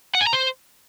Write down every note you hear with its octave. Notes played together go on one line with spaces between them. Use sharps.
F#5
G#5
A#5
C5